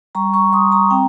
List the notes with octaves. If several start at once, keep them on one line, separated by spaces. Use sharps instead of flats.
G3 A#5 C#6
A#5 C#6
G3 C6 D#6
A#5 C#6
C4 G5 A#5